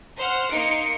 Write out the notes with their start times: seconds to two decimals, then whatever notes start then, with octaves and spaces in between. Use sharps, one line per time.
0.19 C5 F#5 F6
0.52 A#3 D#4 C6 C#7 D7